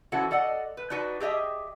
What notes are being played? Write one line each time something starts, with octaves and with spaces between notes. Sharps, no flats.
E3 C#4 E4 F#4 A4 C5
A4 D5 D#5 F#5
B4
D4 D#4 F#4 B4
G4 G#4 D#5 E5 G5